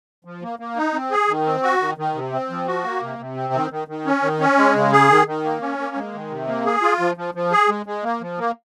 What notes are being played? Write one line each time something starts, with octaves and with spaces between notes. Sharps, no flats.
F3
A#3
A#3
D#4
C4
G#4
D#3
C4
F#4
D#3
D#3
C3
C4
F3
F#4
A#3
C3
C3
C4
D#3
D#3
D#3
C#4
D#3
C#4
G#3
C#3
G#4
D#3
D#3
A#3
C#4
A#3
G#3
D#3
C3
A#3
G#4
F4
F3
F3
F3
G#4
G#3
G#3
A#3
F3
A#3